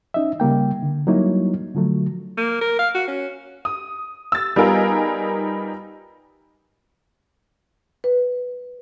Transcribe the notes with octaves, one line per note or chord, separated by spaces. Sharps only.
C#4 D#4 D#5 E5
C#3 G3 A#3 G5
D3
F#3 G3 A#3 D#4 E4 C#5
D3 F3 F#3 A3
A#3
A#4
F5
F#4
C#4
D#6
E6 A6
G3 B3 D#4 F4 G#4 A#4
B4